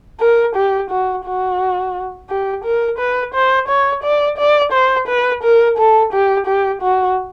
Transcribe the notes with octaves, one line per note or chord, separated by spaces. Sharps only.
A#4
G4
F#4
F#4
G4
A#4
B4
C5
C#5
D5
D5
C5
B4
A#4
A4
G4
G4
F#4